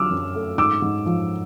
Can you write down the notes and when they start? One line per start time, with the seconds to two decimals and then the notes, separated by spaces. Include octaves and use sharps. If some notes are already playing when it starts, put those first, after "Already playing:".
Already playing: D3 F#3 D6 E6 F6
0.11 F#2
0.35 A3
0.58 G#2 D6 E6
0.82 G#2
1.06 F3